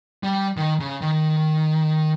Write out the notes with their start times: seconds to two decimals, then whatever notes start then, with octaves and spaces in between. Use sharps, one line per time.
0.23 G3
0.57 D#3
0.80 C#3
1.01 D#3